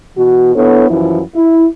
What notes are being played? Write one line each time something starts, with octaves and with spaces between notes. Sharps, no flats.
B2 E3 F#4
B3 D4 E4 A4 C#5
F#2 E3 F3 E4
E4